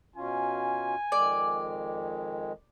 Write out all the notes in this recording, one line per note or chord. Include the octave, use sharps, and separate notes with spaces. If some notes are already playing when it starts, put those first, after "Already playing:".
B2 C#4 F4 G#5
F2 D#3 G#3 D5